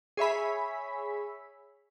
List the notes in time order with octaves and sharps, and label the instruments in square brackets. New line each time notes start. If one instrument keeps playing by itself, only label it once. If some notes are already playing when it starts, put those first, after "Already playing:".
[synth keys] G#4 C#5 E5 B5